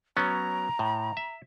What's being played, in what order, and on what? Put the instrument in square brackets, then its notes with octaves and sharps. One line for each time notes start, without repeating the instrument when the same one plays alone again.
[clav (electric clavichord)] F#3 B3 C#4 [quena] A#5
[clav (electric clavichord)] A2
E5